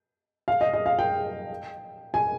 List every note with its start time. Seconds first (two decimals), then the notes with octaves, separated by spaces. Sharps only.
0.48 F5
0.61 D#5
0.74 D#5
0.86 F5
0.99 G5
2.14 G#5